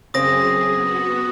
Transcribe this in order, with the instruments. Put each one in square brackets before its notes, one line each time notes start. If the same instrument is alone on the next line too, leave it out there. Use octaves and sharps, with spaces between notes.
[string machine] F#2 G#4 [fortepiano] C#3 C4 [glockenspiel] D#6 A#6
[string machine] B3 F#4